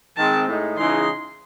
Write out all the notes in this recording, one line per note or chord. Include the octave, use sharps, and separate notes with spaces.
D#3 G#3 C4 A5
A2 G#3 D#4
C#3 E3 G#3 D#4 C6